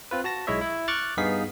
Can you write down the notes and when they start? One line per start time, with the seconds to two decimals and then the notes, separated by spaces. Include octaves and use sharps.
0.11 C4 F4 B4
0.24 F#4 A5 A#6
0.47 B1 G#3 E4 C#5 D#5 E5
0.61 E4
0.88 C#6 D6 F6 F#6 A6
1.17 G2 B3 D#4 G#4 F5 B6